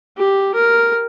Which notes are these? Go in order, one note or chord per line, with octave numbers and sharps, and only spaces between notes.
G4
A#4